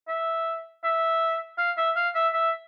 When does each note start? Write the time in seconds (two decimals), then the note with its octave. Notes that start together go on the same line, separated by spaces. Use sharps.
0.08 E5
0.84 E5
1.58 F5
1.77 E5
1.96 F5
2.15 E5
2.33 E5